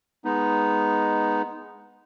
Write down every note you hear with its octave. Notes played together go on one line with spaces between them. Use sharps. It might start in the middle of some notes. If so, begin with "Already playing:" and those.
G#3 B3 D#4